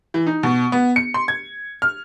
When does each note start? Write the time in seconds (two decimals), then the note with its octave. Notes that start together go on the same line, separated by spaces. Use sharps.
0.14 E3
0.27 D#4
0.43 B2
0.72 B3
0.96 C#7
1.14 C6
1.28 G#6
1.82 F6